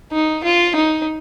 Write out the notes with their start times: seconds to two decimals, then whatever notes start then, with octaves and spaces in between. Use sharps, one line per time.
0.12 D#4
0.43 F4
0.75 D#4